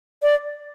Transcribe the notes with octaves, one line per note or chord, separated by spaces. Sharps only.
D5